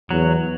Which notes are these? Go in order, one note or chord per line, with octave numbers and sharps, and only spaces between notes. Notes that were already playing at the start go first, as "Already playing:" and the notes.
E2 F#3